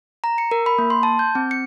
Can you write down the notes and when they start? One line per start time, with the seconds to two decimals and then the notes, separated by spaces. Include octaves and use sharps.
0.24 A#5
0.38 C#7
0.51 A#4
0.66 B5
0.78 A#3
0.90 C6
1.03 A5
1.19 G6
1.35 C4
1.51 C#7